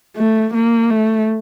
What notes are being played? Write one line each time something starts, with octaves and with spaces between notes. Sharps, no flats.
A3
A#3
A3